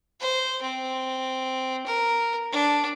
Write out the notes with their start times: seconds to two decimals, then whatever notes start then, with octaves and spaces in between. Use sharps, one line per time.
0.21 C5
0.62 C4
1.86 A#4
2.53 D4